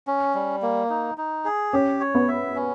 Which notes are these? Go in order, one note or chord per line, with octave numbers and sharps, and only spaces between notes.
C#4
G3
A#3
D#4
D#4
G#4
C#4 G4
C#5
B3
E5
C#4